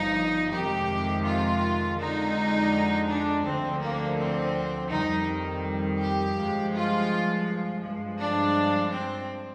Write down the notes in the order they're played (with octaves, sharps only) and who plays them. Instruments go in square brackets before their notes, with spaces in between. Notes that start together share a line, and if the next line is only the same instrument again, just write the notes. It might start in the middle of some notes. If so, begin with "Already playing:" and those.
Already playing: [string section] G1 G2 F3 D#4
F2 C3 D#3 G#3 G4
F4
F2 D3 G#3 D#4
D4
D2 D3 F3 C4
A#3
C4
F2 D#3 G3 D#4
G4
G2 F3 G#3
F4
G2 F3 G#3
D4
C4